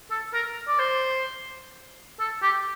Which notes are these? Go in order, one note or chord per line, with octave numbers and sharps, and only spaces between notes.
A4
A#4
D5
C5
A4
G4